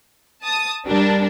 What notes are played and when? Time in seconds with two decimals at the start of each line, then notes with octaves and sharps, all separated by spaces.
0.43 A5 D#6
0.86 G3 D4 A#4